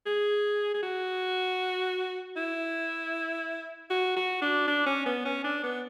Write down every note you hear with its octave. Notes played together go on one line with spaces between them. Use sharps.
G#4
G#4
F#4
E4
F#4
F#4
D4
D4
C#4
B3
C#4
D4
B3